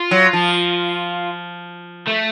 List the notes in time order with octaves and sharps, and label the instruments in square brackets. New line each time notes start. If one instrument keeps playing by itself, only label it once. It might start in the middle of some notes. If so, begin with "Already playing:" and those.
Already playing: [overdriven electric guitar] F4
[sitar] F#3
F3
[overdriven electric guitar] A3